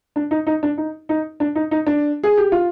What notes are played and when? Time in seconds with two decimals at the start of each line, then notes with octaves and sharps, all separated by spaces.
0.16 D4
0.31 D#4
0.47 D#4
0.63 D4
0.78 D#4
1.09 D#4
1.40 D4
1.55 D#4
1.71 D#4
1.87 D4
2.23 G#4
2.37 G4
2.52 F4